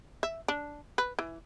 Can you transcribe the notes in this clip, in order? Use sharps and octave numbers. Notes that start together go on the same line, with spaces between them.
E5
D4
B4
E3